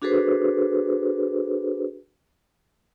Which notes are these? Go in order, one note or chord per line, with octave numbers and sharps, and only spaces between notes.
D4 F#4 G#4 A4 B4 C5